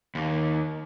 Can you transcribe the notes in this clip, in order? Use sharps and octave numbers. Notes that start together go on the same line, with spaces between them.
D#2